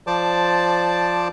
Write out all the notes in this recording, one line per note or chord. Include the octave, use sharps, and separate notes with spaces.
F3 C5 D5 A5 D6